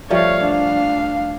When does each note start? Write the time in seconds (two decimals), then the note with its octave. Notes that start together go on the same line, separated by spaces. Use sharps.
0.10 F3 G3 A3 C#5 F5
0.44 D4 F5